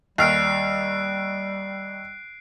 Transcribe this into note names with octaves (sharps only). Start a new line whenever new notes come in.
D#2 G3 F6 F#6 C7 D7